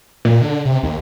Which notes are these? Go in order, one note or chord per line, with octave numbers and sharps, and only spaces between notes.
A#2
D3
C3
D#2